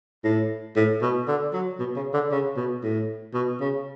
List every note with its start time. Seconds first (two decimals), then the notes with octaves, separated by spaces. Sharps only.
0.24 A2
0.76 A2
1.02 B2
1.28 D3
1.53 F#3
1.79 B2
1.96 C#3
2.14 D3
2.31 C#3
2.56 B2
2.83 A2
3.34 B2
3.61 C#3